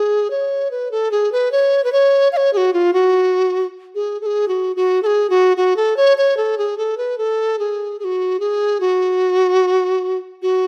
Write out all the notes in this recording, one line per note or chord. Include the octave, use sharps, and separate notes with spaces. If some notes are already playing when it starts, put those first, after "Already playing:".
Already playing: G#4
C#5
B4
A4
G#4
B4
C#5
B4
C#5
F5
C#5
G#4
F#4
F4
F#4
G#4
A4
G#4
F#4
F#4
A4
G#4
F#4
F#4
A4
C#5
C#5
A4
G#4
A4
B4
A4
G#4
G#4
F#4
G#4
F#4
F#4